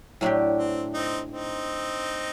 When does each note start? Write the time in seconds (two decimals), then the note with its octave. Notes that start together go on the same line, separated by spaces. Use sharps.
0.21 A2 F#3 A3 D4 G4
0.58 C4
0.94 C4 D#4
1.31 C4 D#4